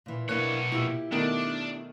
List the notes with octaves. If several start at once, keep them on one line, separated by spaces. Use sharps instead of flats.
A#2 E3
B2 A#3 D4 E4 C#5 F#6
A#2 E4 G4 E6
B2 D#3 A3 D4